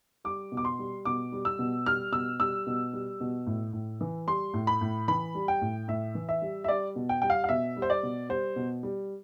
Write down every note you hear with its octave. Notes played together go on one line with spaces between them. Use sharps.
G3 D6
B2
D6
C6
G3
B2 D6
G3
E6
B2
G3 F6
B2 E6
G3 E6
B2
G3
B2
A2
A2
E3
G3 C6
A2
B5
A2
E3 B5
G3
G5
A2
A2 E5
E3
E5
G3
E5
G3 D5
B2
G5
G3 G5
F5
F5
B2 E5
G3
C5
D5
B2
G3 C5
B2
G3